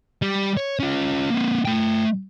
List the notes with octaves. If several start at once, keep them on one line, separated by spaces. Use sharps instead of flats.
G3
C#5
C#4 F4
A#3 C4
A3 G5